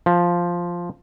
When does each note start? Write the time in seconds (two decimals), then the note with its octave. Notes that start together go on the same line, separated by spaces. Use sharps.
0.06 F3